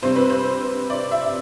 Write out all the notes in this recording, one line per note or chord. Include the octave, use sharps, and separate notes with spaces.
C3 G3 C4 C5
B4
C5
D5
E5